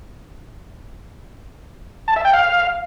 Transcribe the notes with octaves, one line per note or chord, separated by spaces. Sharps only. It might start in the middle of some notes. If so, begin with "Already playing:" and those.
A5
E5
G5
F5